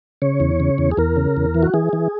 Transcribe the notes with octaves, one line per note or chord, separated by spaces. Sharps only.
C#3 C#5
E2
C#3
E2
G#4
E2 A#4
C#3
E2
E3
F#4
E3 G#4
E3